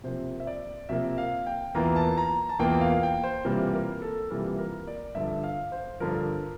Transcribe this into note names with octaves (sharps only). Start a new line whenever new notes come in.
C3 F3 A#3 C5
E5
D5
C3 F3 A#3 E5
F5
G5
E2 E3 A#3 F4 A#5
A5
A#5
A5
E2 E3 A#3 F4 G5
F5
G5
C5
C3 E3 G3 A#3 F4 A#4
A#4
A4
C3 E3 G3 A#3 F4 A#4
A#4
D5
G2 D3 F3 E5
F5
C5
G2 D3 F3 A#4